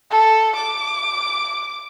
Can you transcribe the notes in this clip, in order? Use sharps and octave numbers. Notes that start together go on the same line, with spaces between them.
A4
D6